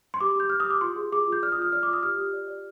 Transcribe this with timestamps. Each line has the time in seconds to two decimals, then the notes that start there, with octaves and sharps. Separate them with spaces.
0.14 C6
0.20 G4 D6
0.36 G4 G6
0.49 G4 F6
0.60 D#6
0.66 G4 D6
0.81 F4 C6
0.96 G#4
1.12 G#4 D6
1.28 F4 G6
1.43 D5 F6
1.52 D#6
1.58 F4 F6
1.72 D5 F6
1.83 D6
1.88 F4
1.93 D#6
2.03 G4 F6
2.17 G4
2.33 D5
2.48 D5